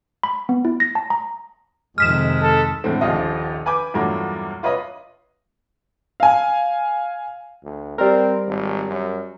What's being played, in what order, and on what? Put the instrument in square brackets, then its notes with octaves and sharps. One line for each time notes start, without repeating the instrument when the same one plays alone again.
[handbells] B5
B3
E4
A#6
A5
A#5
[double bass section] F2 C3 D#3 [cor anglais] G#3 [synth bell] F6 B6 E7
[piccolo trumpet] A4
[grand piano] E2 A2 D3 G#3 C4
D#1 A#1 F3 F4 D#5
B4 G#5 B5 D6 G6
E2 G2 A#2 F#3 A3
F4 B4 C#5 D#5 B5
[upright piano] F5 G#5
[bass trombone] D2
[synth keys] G3 A#4 [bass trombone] C4
[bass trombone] G#1
F#2